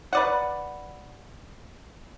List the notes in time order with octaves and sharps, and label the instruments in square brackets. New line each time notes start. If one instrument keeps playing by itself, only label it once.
[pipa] B4 D5 F#5